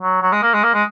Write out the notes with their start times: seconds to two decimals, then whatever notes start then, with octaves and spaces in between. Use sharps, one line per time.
0.01 F#3
0.22 F#3
0.32 G#3
0.43 A#3
0.54 G#3
0.63 A#3
0.74 G#3